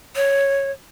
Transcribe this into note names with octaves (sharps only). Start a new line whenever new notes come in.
C#5